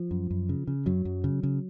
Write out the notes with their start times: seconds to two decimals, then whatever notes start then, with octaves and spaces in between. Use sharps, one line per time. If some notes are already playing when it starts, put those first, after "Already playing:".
Already playing: F3
0.11 F#2
0.31 F#2
0.49 C#3
0.67 C#3
0.86 F#2 F#3
1.05 F#2
1.24 C#3
1.43 C#3